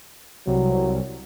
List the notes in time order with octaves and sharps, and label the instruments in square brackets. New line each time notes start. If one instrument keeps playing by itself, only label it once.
[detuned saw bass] C2 [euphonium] F#3